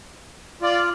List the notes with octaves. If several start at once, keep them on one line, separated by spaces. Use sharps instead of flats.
F4 D5